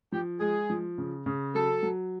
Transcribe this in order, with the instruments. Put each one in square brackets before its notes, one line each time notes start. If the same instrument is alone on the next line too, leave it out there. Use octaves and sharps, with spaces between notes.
[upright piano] F3 [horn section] G4
[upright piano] G#3 [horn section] G#4
[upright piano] F3
C#3
C#3
[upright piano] F#3 [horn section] A4
[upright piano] F#3